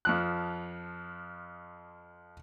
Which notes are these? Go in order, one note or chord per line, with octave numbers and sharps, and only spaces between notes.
F2 F3 F#6